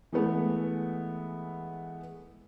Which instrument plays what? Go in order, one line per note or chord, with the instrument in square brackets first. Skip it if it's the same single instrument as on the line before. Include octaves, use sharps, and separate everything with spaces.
[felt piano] E3 G#3 A3 B3